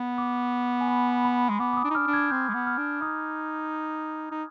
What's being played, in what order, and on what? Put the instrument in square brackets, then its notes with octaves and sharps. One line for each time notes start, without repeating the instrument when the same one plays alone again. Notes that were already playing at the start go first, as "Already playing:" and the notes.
Already playing: [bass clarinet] B3
[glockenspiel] D6
G#5
B5
B5
[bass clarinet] G#3
[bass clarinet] B3 [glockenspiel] D6
[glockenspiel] D6
D#6
[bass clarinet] D4
D#4
[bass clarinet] D4 [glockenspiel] F6
[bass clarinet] D4
[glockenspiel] G#6
[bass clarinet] C4 [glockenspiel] G6
[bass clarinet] G#3
B3
[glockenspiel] F6
[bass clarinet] D4
[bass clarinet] D#4 [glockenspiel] D#6
[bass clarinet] D#4